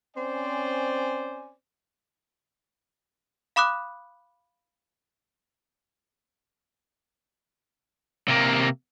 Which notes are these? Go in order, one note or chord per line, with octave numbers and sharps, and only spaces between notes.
C4 C#4 C5 D5 G#5
F5 B5 D6 D#6 F#6
C3 A#3